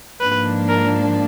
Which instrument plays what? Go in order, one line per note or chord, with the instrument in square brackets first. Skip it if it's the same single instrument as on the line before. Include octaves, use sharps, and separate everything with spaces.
[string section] G#2 F3 A#3 D4 [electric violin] B4
[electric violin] A#4